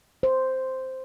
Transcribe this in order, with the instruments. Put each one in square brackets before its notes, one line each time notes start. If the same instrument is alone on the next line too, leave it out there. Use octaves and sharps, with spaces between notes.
[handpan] C5